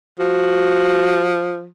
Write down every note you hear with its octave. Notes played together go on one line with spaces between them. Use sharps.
F3 F#4